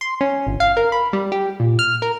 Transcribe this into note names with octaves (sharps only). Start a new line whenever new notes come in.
C6
C#4
G1
F5
A#4
B5
G3
G4
A#2
F6
A#4